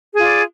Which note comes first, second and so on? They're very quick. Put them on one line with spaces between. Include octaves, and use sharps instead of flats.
G#4 F4 D5